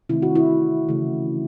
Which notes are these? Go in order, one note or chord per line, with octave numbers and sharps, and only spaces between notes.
C3 D#3 A3 E4
F#4
E4
C#3 E3 A3